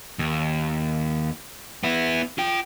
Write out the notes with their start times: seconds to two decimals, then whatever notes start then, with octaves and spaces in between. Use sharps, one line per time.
0.19 D#2
1.84 B3 E4
2.38 F4 G5